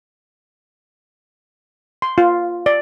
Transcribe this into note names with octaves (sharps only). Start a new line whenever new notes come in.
C6
F4
D5